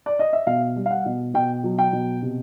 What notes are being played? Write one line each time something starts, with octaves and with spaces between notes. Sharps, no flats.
D5
D#5
E5
B2 F5
G3
F5
F#5
B2
B2 G5
F#3
G5
B2
C3